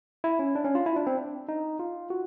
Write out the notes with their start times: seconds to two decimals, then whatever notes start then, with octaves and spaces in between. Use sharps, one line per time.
0.24 E4
0.39 C#4
0.55 D4
0.65 C#4
0.75 F4
0.86 E4
0.96 D4
1.07 C4
1.18 D4
1.49 D#4
1.79 F4
2.10 F#4